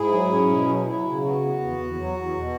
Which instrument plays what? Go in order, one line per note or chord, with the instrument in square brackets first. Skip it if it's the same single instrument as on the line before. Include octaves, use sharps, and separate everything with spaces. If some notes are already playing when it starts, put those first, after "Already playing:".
Already playing: [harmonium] G#2 E4 G#4
F#3
C#4
B2
F#3
F#3 E4
C#3
B3 F#4
B3
E2
E2
F#3
E2
B2